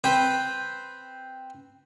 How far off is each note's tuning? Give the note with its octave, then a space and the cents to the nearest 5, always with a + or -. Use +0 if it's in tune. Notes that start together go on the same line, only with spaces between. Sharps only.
C4 +0 B4 +0 G5 +0